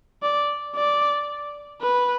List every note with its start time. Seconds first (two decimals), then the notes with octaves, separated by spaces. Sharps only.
0.23 D5
0.75 D5
1.81 B4